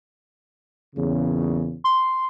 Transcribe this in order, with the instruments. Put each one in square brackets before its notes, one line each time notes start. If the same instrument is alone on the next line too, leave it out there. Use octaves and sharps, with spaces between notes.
[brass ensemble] E2 A#2 C#3
[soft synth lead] C6